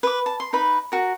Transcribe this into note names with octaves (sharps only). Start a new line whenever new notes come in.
B4 D6
A5
C6
D#4 B4 B5
F#4 A#4